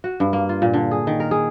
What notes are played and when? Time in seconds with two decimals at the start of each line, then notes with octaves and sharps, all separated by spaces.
0.04 F#4
0.20 G2
0.33 A#3
0.49 F4
0.62 A#2
0.73 D3
0.91 G#4
1.07 D#3
1.20 A#4
1.31 G#4